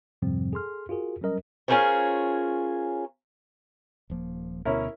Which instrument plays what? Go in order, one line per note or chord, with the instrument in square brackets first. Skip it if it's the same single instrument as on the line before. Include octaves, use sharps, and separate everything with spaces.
[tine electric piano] F2 G#2 C3 F3 G3 C4
G#4 A4 C6 F6
F4 F#4 G#4 A#4
F#3 G3 C#4 A#4 D#5
[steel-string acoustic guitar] C#4 F4 G#4 A#4 C5 C#5
[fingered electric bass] D#1 F3 A#3
[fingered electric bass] D2 B2 B3 [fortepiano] C#4 E4 A#4